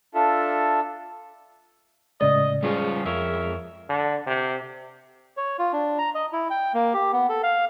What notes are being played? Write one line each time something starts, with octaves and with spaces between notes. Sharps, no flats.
D4 F4 A4 E5
A2 C#3 G#3 D5 D#5
C#3 F3 G3 G#3 C#4 F4 G#4
F2 A#4 C#5 E5
D3
C3
C#5
F4
D4
A#5
D#5
E4
G5
A#3
G4
B3
A4
F5